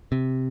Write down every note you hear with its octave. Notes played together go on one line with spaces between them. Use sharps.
C3